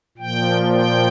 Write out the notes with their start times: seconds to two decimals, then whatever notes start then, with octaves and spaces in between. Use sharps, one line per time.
0.18 A#2 F3 G5
0.72 G5